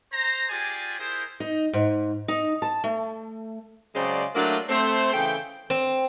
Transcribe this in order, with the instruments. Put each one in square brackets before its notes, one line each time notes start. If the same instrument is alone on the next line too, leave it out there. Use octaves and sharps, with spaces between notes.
[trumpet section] C5 A#5
F4 G4 G#4 D5 G#5
E4 G#4 A#4 C5
[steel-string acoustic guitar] D#4
G#2
D#4
A5
A3
[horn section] C#3 F#3 G#3 C5 D5
F#3 A3 A#3 D4 E4 F4
A3 C4 C5
C#3 E3 A3 G5
[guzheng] C4